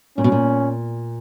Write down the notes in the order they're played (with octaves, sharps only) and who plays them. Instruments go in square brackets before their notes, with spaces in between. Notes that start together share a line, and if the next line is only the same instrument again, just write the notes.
[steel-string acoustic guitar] A#2 [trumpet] C#4
[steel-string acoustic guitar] B2
A#2